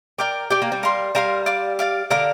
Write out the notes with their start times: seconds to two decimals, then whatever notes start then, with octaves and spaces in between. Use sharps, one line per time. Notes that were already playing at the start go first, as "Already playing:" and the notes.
0.18 A#4 D5 G5 D6
0.50 G4 D5 G5 D6
0.62 A#3
0.72 G3
0.83 A#4 F5 C6
1.15 G3 A#4 F5 C6
1.46 D5 F5 D6
1.79 D5 F5 D6
2.10 D3 A#4 F5 D6